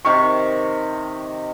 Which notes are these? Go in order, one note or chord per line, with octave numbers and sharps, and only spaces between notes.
C3 D#3 A#4 C#6